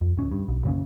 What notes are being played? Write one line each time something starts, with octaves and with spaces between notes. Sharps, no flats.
F2
D1 C#4
G2
B1
F#2 C#3 A#3 C#4